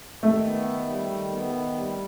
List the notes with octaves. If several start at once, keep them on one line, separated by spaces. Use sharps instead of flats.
D#3 A3
B3
D#3
G3
D#3
B3
D#3
G3